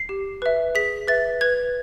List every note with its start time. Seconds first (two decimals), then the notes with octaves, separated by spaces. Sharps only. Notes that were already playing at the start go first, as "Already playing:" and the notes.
Already playing: C7
0.09 G4
0.42 B4 E5
0.75 G#4 B6
1.07 B4 E5 A6
1.41 B4 G#6